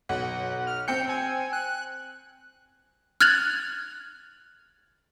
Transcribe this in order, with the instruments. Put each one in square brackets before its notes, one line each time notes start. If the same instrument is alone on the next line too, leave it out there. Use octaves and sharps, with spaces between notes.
[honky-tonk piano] B1 [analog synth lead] F#5
[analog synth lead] F6
[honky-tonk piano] C4 G5 C#7 [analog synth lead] G6
[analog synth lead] G#5
F#6
[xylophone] F6 F#6 G#6 A6 F7 F#7